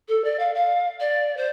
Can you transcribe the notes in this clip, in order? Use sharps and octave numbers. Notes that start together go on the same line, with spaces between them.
A4
D5
F5
F5
D5
C5